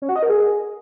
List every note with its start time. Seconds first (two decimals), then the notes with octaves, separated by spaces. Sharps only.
0.02 C#4
0.09 F#4
0.16 D#5
0.23 A#4
0.30 G#4